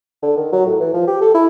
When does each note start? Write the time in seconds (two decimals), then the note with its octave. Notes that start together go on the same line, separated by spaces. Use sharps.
0.22 D3
0.37 D#3
0.53 F#3
0.66 A2
0.80 E3
0.94 F3
1.07 G4
1.21 A4
1.34 E4